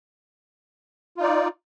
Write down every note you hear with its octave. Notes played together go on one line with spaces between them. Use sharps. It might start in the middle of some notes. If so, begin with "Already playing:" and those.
D#4 F4 D5